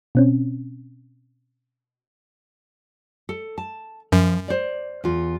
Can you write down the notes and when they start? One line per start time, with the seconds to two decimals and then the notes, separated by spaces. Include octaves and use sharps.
0.15 B2 C4 C#4
3.29 A4
3.58 A5
4.12 F#2 F3
4.48 C5 D5
5.04 E2 F4